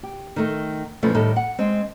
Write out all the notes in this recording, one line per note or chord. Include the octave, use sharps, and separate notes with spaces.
G4
D#3 A3
A#2 C#3 E3 F3 A3
A2 D#3 G3 D#4 A4
F#5
G#3 C4